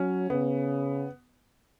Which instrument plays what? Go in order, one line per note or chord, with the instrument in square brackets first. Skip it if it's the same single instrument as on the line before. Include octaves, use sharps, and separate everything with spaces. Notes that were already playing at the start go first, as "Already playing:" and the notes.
Already playing: [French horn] F#3 [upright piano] C#4
[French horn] C#3 [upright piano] B3